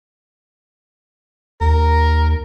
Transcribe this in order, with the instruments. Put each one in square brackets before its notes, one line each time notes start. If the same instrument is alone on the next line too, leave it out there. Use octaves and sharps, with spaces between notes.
[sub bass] D#2 [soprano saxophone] A#4